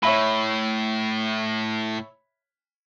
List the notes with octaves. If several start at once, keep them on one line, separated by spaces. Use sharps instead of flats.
A2 C#5 E5 B5